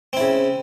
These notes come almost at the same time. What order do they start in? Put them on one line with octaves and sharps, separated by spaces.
C4 E4 C#3